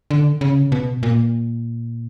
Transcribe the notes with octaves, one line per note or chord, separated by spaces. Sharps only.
D3
C#3
B2
A#2